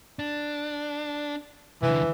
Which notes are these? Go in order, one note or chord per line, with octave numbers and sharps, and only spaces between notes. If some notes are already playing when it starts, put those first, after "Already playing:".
D4
C2 D3 E3